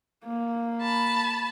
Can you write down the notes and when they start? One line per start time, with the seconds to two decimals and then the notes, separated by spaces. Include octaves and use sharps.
0.25 A#3
0.82 A5 B5